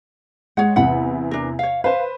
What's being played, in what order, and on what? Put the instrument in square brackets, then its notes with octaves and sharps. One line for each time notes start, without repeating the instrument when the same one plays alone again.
[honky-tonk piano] G#3 [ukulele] C#5 F#5
[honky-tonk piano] E2 C3 [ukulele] F#5 B5
[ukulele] D4 A#4
C#5 F5
[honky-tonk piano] B4 C5 [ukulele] F5